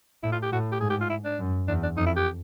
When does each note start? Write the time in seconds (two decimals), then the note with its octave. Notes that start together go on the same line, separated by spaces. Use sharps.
0.23 A2 E4
0.32 F4
0.43 G4
0.52 A2 F#4
0.72 G4
0.81 G#2 G#4
0.90 G4
1.01 F4
1.10 E4
1.25 D4
1.39 F#2
1.68 E2 D4
1.83 D4
1.97 F2 D#4
2.06 E4
2.16 G4